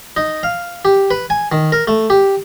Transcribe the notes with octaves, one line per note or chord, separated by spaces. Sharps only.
D#4
F5
G4
B4
G#5
D#3
A#4
A3
G4